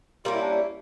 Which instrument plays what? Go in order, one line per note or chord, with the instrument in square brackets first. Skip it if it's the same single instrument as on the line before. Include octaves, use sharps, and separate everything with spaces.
[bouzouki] G3 A#3 C#4 [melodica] F4
[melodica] E4
D4
E4